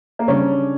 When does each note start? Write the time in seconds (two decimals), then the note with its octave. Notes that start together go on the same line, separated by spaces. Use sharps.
0.19 A#3
0.28 C#3 G3 C#4 D4